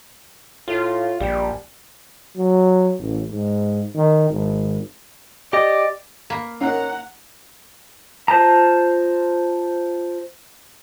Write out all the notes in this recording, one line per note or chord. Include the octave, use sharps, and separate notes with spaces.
A2 F4
A#1 G3
F#3
A1
G#2
D#3
G#1
G4 D5 D#5
A#3 B5
C#4 D#4 A#4 F#5 A#5
F4 C5 A5 A#5